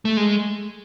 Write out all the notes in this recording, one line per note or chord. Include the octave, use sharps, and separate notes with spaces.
A3
G#3